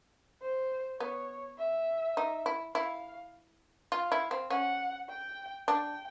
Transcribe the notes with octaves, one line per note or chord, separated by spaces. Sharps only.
C5
B3 C#5
E5
D#4
E4
E4 F5
F4 F5
E4
C4
C#4 F#5
G5
D4 G5